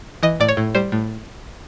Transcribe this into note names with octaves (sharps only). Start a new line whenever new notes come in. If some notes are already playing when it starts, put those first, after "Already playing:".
E3 D#5
A2 D5
C#5
A2
G3 C5
A2